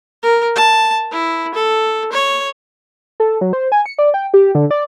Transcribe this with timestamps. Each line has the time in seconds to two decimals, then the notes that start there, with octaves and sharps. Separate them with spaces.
0.22 A#4
0.56 A5
1.11 E4
1.54 A4
2.12 C#5
3.20 A4
3.41 F#3
3.53 C5
3.72 G#5
3.86 C#7
3.99 D5
4.14 G5
4.34 G4
4.55 D3
4.71 D5